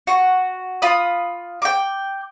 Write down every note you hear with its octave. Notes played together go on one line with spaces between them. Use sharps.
F#4
F4 B5 D#6
G5 D6